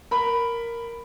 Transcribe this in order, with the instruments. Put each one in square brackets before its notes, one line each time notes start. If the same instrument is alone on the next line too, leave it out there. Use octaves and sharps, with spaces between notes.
[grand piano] A#4 B5